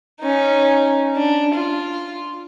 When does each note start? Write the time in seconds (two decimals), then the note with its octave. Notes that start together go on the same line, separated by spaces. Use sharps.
0.20 C#4 D#4
1.16 D4
1.54 F4